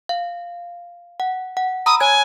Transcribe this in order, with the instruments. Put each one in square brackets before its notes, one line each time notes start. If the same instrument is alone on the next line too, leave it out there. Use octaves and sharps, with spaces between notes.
[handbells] F5
F#5
F#5
[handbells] A#5 B5 E6 [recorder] D#6
[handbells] C#5 G#6 [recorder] G#5